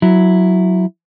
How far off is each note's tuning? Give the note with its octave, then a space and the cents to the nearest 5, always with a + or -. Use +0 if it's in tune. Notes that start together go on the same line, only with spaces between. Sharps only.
F#3 +0 E4 +0